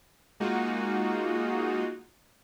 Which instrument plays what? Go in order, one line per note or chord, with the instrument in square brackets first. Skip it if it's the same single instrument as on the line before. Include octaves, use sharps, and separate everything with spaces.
[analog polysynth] G#3 A#3 D#4 F4 F#4